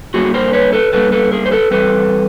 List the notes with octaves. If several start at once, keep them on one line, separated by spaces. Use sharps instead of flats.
D3 G3 A#3 F#4 G#4
A#4 C5
B4 C#5
A4 B4
D3 G3 A#3 A4 B4
A4 B4
G#4 A#4
C5
A4 B4
E3 G3 C4 A4 B4